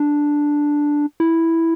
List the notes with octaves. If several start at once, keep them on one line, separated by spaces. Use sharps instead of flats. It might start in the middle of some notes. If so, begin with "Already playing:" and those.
Already playing: D4
E4